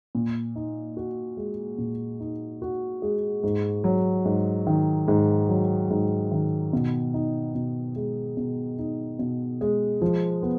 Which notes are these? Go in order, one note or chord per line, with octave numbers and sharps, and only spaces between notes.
A#2
D#4
F#4
G#3
A#2
D#4
F#4
G#3
G#2
F#3
G#2
D#3
G#2
F#3
G#2
D#3
B2
D#4
B2
G#3
B2
D#4
B2
G#3
F3
B3